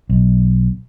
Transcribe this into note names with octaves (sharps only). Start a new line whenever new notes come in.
B1